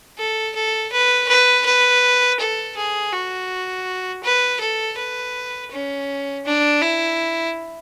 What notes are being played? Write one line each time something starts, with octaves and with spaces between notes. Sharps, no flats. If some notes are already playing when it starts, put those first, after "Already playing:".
A4
A4
B4
B4
B4
A4
G#4
F#4
B4
A4
B4
C#4
D4
E4